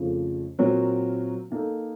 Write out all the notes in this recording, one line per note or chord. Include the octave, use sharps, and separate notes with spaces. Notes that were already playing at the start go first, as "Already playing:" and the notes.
Already playing: F2 C#3 F3 A3
A#2 F#3 C4 F#4 A#4
D#3 A#3 D#4 A4